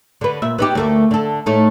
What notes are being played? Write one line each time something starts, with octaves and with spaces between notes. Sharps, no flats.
D3 B4
A#2 E5
B3 D#4 G4
D2 A3 A#3
D3 A4
A2 A3 D#4